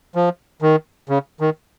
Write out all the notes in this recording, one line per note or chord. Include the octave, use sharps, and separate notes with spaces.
F3
D#3
C#3
D#3